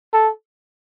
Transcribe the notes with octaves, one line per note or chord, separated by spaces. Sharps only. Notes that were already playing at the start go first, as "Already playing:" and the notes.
A4